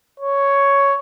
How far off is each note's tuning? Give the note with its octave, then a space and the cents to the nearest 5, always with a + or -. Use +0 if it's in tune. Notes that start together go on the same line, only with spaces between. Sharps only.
C#5 +5